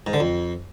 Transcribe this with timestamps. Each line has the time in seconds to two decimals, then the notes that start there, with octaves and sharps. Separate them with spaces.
0.07 G#2
0.13 D3
0.20 F2